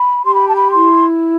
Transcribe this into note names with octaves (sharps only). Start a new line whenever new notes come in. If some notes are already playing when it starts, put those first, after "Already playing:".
Already playing: B5
G4 C6
B5
A5
B5
E4 C6